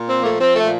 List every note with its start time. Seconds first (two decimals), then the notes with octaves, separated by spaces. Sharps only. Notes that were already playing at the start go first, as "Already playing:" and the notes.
Already playing: A#2
0.09 C4
0.17 F3 A#3
0.25 A3
0.40 F3 C4
0.56 A3
0.64 A#2